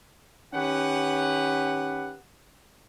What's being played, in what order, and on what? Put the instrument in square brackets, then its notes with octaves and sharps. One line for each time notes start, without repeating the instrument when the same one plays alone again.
[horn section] D#3 C#4 G4 B4 F#5